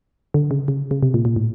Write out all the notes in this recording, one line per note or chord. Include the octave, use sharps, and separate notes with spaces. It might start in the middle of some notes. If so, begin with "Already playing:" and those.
D3
C#3
C#3
C#3
C3
A#2
A#2
A2